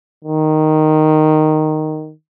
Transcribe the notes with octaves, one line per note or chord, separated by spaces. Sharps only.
D#3